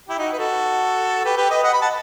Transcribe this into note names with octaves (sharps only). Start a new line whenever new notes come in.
E4 G4
D#4 F#4
B4
F#4 A4
G4 B4
G4 B4
B4 D#5
D#5 F#5
B5
F#5 A5